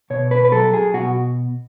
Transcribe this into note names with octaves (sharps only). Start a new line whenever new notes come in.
B2 C#5
B4
B4
F#3 A4
G#4
B2 F#4